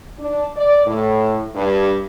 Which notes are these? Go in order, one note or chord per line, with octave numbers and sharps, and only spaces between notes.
D4
D5
A2
G2